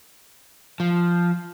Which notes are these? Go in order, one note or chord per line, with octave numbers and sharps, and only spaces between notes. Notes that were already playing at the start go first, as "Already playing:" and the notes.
F3